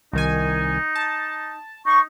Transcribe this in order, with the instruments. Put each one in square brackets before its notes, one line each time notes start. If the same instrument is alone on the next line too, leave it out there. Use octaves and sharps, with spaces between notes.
[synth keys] C2 D#3 G#5 [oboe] D#4
[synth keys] A5
[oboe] D#4 [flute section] C#6